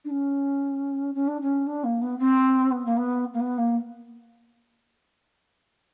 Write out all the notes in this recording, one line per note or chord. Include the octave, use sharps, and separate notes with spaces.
D4
C#4
C#4
D4
C#4
D4
A#3
B3
C4
B3
A#3
B3
A#3
B3
A#3